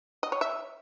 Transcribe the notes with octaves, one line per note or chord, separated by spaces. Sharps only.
D#5
C#5
E5